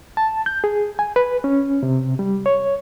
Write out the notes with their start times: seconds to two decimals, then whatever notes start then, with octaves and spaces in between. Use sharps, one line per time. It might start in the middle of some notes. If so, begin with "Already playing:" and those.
0.17 A5
0.46 G6
0.64 G#4
0.99 G#5
1.16 B4
1.44 C#4
1.83 C3
2.19 G3
2.46 C#5